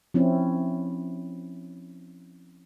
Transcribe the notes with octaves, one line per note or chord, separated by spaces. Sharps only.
F3 C4 C#4 E4